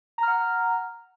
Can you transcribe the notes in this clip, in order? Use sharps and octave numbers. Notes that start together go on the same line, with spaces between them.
F#5 A#5 F6